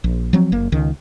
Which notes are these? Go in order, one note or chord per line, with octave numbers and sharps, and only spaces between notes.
A#1
F3 F#3 C4
F#1 A#3
C#2 D#3